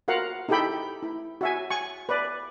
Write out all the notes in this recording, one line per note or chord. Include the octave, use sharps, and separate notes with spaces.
F4 F#4 A#4 F5 F#5
D#4 E4 G4 A4 G5 B5
E4
F#4 E5 G#5
G#5 C#6
B4 D5